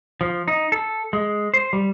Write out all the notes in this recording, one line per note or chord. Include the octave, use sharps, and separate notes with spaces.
F3
D#4
A4
G#3
C5
G3